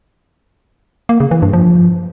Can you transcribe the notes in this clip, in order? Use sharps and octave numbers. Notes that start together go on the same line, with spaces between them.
A#3
C#3
E3
G2
F3